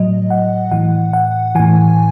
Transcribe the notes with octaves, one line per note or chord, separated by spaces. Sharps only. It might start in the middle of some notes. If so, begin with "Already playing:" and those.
Already playing: A2 F#3 D#5
F#5
A2 E3 F#5
F#5
A2 E3 G#5